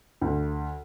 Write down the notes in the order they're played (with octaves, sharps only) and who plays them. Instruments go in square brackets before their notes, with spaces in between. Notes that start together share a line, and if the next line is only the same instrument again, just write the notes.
[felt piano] D2